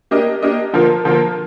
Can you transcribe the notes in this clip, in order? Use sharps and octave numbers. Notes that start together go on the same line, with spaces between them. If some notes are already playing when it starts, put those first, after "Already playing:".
A#3 D4 G4 A#4 D#5
A#3 D4 G4 A#4 D#5
D3 F3 A#3 F4 A#4
D3 F3 A#3 F4 A#4